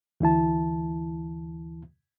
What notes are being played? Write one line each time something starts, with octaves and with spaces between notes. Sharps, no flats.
D2 E3 E4 A5